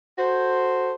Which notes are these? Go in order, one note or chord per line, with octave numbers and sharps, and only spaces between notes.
F#4 A4 C5